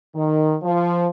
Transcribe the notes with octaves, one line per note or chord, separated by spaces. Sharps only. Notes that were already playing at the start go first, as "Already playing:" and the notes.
D#3
F3